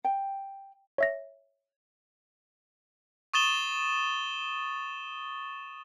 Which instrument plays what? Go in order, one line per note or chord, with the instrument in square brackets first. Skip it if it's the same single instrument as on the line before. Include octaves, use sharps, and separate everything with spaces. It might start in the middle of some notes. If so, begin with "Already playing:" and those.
[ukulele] G5
[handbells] C#5 E5 A#6
[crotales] C#6 D#6 A6 E7 G7